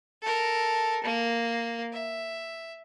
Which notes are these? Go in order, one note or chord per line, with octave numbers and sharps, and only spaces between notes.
A4 A#4
A#3
E5